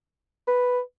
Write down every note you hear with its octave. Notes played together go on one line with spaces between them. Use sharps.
B4